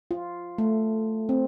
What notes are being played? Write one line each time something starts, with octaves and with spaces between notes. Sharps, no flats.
F4
A3
C4